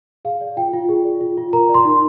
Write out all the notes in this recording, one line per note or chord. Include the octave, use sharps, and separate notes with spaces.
G#4 F5
D5
F4 G5
F4
G#4
D5
F4
F4
A#4 A#5
D5
C6
D#4